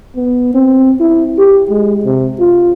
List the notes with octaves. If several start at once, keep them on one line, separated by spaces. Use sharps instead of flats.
B3
C4
E4
G4
G#3
C3
F4